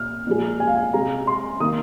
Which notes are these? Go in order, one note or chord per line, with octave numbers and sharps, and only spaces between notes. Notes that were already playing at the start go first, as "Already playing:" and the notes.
Already playing: A#2 F6
A#2 F3 G#3
G#5
F5
G#5
C3 G#3 A#5
C6
D#3 A#3 D#6